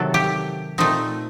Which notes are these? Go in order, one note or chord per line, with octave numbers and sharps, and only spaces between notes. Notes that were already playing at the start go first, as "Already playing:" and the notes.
Already playing: C3 D#3 F#3 A4
G4
A#2 A3 C4 D#4